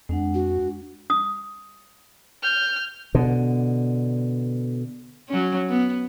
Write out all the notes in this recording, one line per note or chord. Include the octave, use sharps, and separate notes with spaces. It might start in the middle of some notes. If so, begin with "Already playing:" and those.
F2 G#3 D4 F#5
F#4
D#6
F6 G6
B2 D3
F#3 C#4
B3